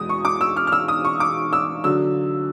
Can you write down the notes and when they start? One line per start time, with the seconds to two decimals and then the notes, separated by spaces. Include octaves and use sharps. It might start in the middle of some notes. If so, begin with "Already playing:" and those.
Already playing: E2 B2 G#3 D#6
0.09 C#6
0.25 D6
0.41 E6
0.56 F6
0.67 F6
0.72 E6
0.88 D#6
1.05 C#6
1.20 D6
1.53 E6
1.84 D3 F#3 E6